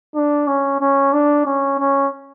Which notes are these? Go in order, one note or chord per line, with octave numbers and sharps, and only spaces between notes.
D4
C#4
C#4
D4
C#4
C#4